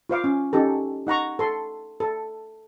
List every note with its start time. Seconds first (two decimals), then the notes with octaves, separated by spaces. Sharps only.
0.10 F4 C5 F5 D6
0.24 C#4
0.53 C#4 D#4 G4 A4
1.07 D#4 F#5 A#5 C#6
1.39 A4 C6
2.00 A4